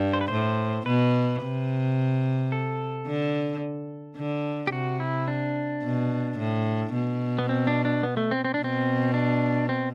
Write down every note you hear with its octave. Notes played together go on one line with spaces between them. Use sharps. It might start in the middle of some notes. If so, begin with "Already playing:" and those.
Already playing: G2
C5
B4
A2 C5
B2 B4
C3
A4
D3
D3
G4
C3 F#4
E4
D4
B2
A2
B2
B3
C4
D4
D4
B3
A3
C4
C4
D4
B2 C4
D4
C4